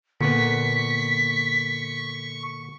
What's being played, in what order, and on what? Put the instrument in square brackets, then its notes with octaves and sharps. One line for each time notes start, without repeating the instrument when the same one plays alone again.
[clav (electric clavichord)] A#2 B3 [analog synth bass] D3 [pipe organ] C#6 [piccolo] B6